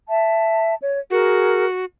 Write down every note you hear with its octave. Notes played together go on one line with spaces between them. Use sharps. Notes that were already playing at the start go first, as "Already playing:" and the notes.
E5 A5
C#5
F#4 G#4 A#4